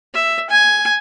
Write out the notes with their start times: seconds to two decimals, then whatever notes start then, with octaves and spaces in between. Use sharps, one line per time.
0.14 E5
0.50 G#5